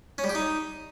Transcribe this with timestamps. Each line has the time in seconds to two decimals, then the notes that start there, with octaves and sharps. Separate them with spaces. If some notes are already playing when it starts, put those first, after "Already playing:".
0.18 C#4
0.24 G3
0.29 G4
0.35 D#4